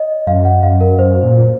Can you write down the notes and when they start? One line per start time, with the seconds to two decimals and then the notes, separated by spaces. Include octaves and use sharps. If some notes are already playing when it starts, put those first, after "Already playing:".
Already playing: C#5 D#5
0.27 F#2 F5
0.45 F#5
0.63 F#2 F5
0.81 A#4
0.98 F#2 C5
1.23 A#2